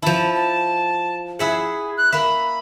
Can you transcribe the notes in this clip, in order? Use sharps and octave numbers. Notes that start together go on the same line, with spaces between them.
F3 E4 A5
A5
E4 G#4 E5 F#5
F#6
A#3 E5 B5